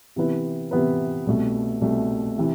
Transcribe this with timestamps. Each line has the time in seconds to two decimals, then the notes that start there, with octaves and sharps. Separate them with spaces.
0.16 C3 E3 B3 E4 B4
0.71 C3 E3 B3 E4 B4
1.27 C2 B2 A3
1.82 C2 B2 A3
2.38 C3 E3